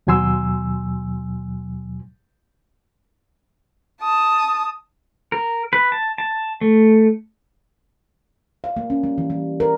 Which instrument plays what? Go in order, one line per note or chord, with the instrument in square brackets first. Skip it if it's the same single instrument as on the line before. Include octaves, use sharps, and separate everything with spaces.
[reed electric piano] D#2 B2 F#3 G#5 C6 E6
[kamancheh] A5 D#6
[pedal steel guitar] A#4
B4
A5
A5
A3
[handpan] F5
A#3
C#4
G3
E3
G3
A#4